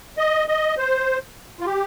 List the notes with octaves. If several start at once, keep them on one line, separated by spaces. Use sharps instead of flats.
D#5
D#5
C5
F4
G4